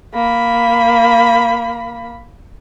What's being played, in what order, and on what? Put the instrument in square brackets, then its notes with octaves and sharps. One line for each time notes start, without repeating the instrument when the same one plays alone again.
[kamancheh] A#3 B5